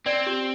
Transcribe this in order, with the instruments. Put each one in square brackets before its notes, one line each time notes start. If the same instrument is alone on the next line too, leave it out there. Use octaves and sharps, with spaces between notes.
[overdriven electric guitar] C4 [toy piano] D5
[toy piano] G4